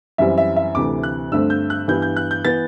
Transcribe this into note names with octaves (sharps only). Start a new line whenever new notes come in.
F#2 E3 G3 C4 E5
E5
E5
D2 C3 E3 A3 D6
F#6
G2 D3 A3 C4 E6
G6
F#6
G2 E3 G3 B3 G6
G6
F#6
G6
E3 B3 A6